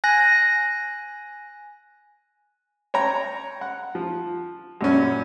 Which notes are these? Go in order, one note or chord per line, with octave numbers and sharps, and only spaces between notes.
G#5 F#6 A#6
C#5 G5 A#5
F#5
F3
F#2 A#2 G3 C#4